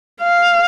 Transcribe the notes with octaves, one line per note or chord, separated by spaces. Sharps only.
F5